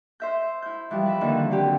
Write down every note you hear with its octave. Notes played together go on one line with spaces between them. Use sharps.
C5 E5 G6
E4 G6
E3 F3 G3
B4 E5
D3 D#3 F3 A#3 D4 F4
D3 F#3 C4 G4